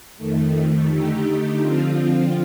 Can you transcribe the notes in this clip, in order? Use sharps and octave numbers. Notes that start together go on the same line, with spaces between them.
F2 D#3 A3
D3 A3 D#4 G4
D3 F3 C4 F4